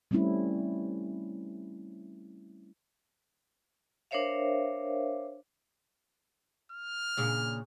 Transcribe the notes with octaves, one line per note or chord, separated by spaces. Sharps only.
G3 A3 C4 C#4 E4
D4 A#4 C5 C#5 E5 F5
F6
A#2 C#3 D4